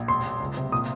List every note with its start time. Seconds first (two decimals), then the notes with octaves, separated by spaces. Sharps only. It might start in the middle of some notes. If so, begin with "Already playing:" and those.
Already playing: A#1
0.08 E1 C6
0.25 E1
0.40 C#2
0.57 C3
0.72 A#2 D#6